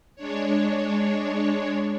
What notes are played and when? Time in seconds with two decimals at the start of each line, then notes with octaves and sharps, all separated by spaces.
0.15 G#3 D4 C#5